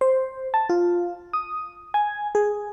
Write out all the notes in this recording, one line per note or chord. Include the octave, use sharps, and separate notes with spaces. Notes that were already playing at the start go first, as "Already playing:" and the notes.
C5
A5
F4
D#6
G#5
G#4